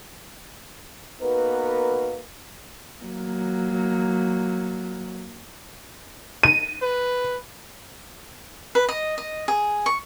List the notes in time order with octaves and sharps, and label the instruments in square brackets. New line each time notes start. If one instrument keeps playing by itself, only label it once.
[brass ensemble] A#3 B3 D#4 F#4 A#4 B4
[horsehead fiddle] F#3 A#3
[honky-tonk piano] D#7
[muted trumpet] B4
[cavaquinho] B4
D#5
D#5
G#4
C#6